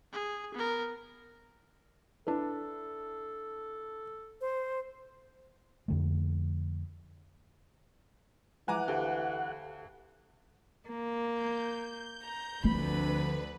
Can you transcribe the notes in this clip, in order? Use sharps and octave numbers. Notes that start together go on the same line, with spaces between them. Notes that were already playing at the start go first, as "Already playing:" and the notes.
G#4
B3 A#4
D4 E4 A4 B4
C5
F2 D3 A3
E3 F3 G#3 F#5 G#5 A#5 D6
D2 G4 A4 F5
A#3
G6
A#5
D2 D3 F3 C4 B4 B5